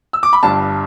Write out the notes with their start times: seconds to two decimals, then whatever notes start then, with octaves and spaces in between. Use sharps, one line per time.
0.13 E6
0.23 D6
0.33 B5
0.43 G1 G2 G3 D4 A5